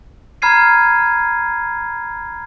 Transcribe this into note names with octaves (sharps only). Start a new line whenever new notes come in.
A#5 B5 F6 G#6 C7 D#7